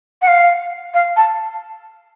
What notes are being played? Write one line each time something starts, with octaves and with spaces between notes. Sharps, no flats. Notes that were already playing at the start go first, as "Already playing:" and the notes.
F#5
F5
F5
A5